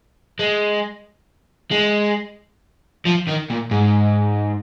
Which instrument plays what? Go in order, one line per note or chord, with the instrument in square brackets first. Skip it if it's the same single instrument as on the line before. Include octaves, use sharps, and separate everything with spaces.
[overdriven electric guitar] G#3
G#3
F3
D#3
A#2
G#2